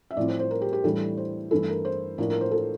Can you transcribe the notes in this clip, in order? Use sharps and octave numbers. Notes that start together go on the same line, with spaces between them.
E5
A2 F3 C4 E4 D5
C5
C5
A#4
G4
G4
A2 E3 G3 D4 A4
C5
G2 E3 A3 E4 A4
A#4
C5
A2 F3 A#3 D4 A#4
A#4
C5
A4